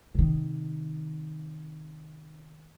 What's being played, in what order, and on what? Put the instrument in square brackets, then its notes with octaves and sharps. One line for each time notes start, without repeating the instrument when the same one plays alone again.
[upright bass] C3 D#3